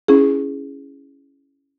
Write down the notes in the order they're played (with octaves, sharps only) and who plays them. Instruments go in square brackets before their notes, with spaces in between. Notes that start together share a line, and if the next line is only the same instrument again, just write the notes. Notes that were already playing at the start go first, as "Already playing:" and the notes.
[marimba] C#4 E4 G#4